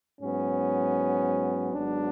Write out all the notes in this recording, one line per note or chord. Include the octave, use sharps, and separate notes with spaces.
G#2 F#3 B3 C#4
G#1 G#2 F#3 B3 D4